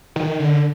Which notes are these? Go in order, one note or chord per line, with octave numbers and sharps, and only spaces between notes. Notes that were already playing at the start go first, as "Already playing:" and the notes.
D#3
D3